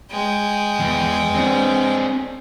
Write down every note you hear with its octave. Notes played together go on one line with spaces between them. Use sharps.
G#3 G5
E2
C4 D4